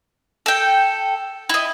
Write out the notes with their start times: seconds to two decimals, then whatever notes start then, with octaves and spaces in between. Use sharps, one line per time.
0.46 A4 G5
1.49 E4 D#5